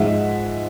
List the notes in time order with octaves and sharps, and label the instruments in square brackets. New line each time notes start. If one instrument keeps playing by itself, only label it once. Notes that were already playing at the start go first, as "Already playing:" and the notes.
Already playing: [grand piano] G#2 F3 G#3 E5 F#5